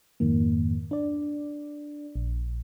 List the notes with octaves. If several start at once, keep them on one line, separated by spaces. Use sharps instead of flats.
F2 G#2 D#3 A#3
D4 D5
A#1